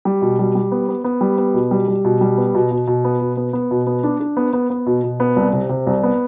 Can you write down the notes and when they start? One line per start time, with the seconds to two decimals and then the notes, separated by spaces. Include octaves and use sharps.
0.05 G3
0.22 B2
0.39 G3
0.55 G3
0.72 B3
0.89 B3
1.04 B3
1.21 G3
1.38 B3
1.54 B2
1.71 G3
1.88 G3
2.04 B2
2.21 G3
2.38 B3
2.55 B2
2.71 B2
2.87 B2
3.04 B3
3.20 B2
3.37 B3
3.53 B3
3.71 B2
3.87 B3
4.04 D4
4.20 D4
4.37 B3
4.53 B3
4.70 B3
4.86 B2
5.04 B2
5.20 B3
5.36 C2
5.53 C3
5.69 C3
5.87 C2
6.03 B3